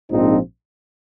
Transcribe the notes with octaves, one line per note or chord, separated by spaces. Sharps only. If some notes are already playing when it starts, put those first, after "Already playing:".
A#1 G#2 F3 C4 D#4